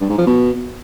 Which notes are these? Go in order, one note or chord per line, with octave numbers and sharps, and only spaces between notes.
G2
G#2
F3
B2